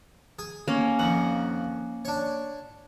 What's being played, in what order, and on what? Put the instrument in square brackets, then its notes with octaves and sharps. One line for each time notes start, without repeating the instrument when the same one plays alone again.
[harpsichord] G#4
[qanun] A#3 C#4
[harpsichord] F2 D#3 [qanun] F#5
[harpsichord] D4 C#5